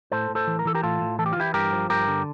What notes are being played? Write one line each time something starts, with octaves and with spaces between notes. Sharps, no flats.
A2 A4 C5
A2
A4 C5
E3
A#4
E3 A4
G4 A#4
A2 F4 A4
A2
E3 A4
G4
F4
E3 E4 G4
G2 G4 A#4
F3
G2 G4 A#4
D3